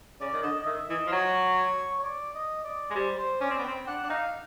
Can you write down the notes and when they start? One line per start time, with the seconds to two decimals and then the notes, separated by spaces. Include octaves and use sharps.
0.21 C#3 D5
0.33 D#3
0.43 D3 D#5
0.61 D#5
0.66 D#3 E5
0.90 E3 D#5
1.07 F3
1.12 F#3 C#5
1.99 C#5
2.03 D5
2.35 D#5
2.64 D5
2.90 G#3
2.95 G3 C5
3.18 C5
3.41 C#4 D5
3.50 C4
3.59 B3
3.64 C4 G5
3.87 D4 F#5
4.04 D4
4.09 D#4 F5